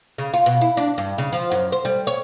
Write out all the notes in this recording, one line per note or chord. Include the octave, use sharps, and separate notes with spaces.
C#3
F4
B2
E4
D4
G2
C#3
F3
F#2
C5
G3
C#5